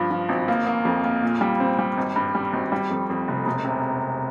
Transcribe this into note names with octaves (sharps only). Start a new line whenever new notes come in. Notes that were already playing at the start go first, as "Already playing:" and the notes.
Already playing: G2 F3
F3
G#1
A#3
A#3
F2
A#3
A#2
G3
C4
G3
G#1
G2
G3
G#1
G3
F2
F2
F1
E1
C3